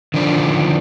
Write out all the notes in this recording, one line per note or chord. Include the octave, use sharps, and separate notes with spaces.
D3 D#3 F3 D4